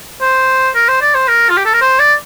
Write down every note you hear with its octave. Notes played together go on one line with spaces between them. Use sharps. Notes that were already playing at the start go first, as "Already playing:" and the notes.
C5
A#4
C5
D5
C5
A#4
F4
G4
A4
A#4
C5
D5